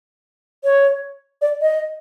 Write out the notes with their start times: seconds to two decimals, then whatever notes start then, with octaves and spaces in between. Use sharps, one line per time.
0.64 C#5
1.42 D5
1.62 D#5